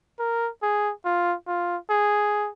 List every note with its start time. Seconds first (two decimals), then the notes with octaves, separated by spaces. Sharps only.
0.19 A#4
0.63 G#4
1.05 F4
1.47 F4
1.90 G#4